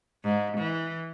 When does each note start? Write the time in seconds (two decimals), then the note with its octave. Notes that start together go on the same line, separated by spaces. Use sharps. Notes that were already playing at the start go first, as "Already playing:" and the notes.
0.24 G#2
0.57 E3